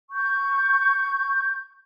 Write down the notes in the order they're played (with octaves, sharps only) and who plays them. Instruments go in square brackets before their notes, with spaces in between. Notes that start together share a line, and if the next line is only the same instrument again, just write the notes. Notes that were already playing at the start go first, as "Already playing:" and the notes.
[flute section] C#6 G6